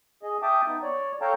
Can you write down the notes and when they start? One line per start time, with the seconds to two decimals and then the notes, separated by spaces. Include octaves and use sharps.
0.23 G#4 D#5
0.42 E5 G5 A5 D6 D#6
0.67 B3 D#4
0.82 C#5 D5
1.21 A4 C#5 F5 G5 A5 A#5